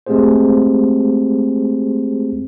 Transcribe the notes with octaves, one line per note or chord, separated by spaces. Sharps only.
G#3 A3 C4 G4 G#4 C5